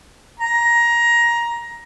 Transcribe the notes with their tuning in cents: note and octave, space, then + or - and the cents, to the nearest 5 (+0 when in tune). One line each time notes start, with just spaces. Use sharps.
A#5 +15